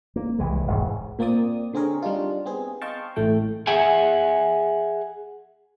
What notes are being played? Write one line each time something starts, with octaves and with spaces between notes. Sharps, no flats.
A#3
C2 E3 G#3
E1 G#2
A#2 A#3 C4 D5 D#6
D3 C4 G#4 A#4 C#5
G3 D4 D#4 F4
B3 C4 G#4
D#5 F5 G5 A5 C6 C#6
A1 A2 A3 G5
G#4 E5 F#5 G#5